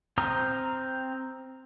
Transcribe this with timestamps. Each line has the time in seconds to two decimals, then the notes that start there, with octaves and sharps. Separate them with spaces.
0.18 C4 C5 A#5 D#6 F6